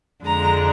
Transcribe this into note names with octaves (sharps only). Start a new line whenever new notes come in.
F2 D3 G#3 D4 A#5